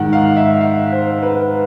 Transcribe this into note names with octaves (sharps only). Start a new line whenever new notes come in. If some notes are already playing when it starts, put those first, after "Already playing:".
Already playing: G#2 D#3 F#5
F5
E5
F5
C5
B4